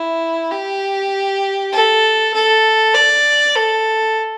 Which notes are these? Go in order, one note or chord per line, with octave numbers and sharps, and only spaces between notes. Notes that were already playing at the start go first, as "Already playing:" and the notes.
Already playing: E4
G4
A4
A4
D5
A4